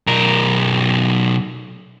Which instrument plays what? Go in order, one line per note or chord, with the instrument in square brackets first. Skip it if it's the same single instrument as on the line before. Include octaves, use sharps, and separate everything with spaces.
[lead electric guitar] B1 A#4